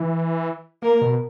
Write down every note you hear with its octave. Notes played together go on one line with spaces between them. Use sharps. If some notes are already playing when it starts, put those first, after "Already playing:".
Already playing: E3
A#3 A#4
B2